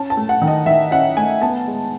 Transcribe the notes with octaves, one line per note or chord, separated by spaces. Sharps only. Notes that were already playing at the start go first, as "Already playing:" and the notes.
Already playing: C#4 A5
A5
A3
F#5
D#3
D#5
D#3 E5
C#4 F#5
A3 G#5
B3 A5
G#3